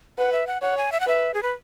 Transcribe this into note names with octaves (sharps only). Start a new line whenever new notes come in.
B4 F#5
E5
F#5
C#5 F#5
G#5
E5
F#5
B4 E5
G#4
B4